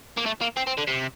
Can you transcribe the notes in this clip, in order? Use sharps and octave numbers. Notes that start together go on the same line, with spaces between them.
A#3
A3
A#3
C4
C4
D3
C3